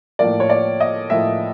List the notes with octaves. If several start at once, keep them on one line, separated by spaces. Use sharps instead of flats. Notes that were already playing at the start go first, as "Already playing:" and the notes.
A2 F3 A#3 D5
C#5
D5
D#5
A2 F3 A#3 E5